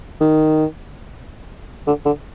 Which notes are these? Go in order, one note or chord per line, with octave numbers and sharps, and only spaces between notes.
D#3
D3
D3